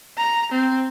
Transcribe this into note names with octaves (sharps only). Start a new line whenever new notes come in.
A#5
C4